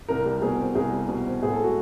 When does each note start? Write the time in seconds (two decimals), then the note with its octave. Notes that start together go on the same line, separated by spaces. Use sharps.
0.08 C2 A#4
0.25 G3
0.42 B2 G#4
0.60 C4
0.75 C2 G#4
0.92 G3
1.09 B2
1.26 C4
1.43 A2 G#4
1.53 A4
1.59 G#3
1.64 F#4